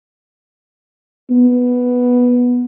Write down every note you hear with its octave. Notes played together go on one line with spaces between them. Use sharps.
B3